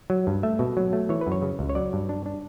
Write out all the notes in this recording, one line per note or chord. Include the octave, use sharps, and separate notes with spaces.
F#3
G2
A3 E5
B2
F#3
A3
E3 C#5
B4
F#2 C#5
C#3
C#2
C#5
F#3 D5
G2
D4
D4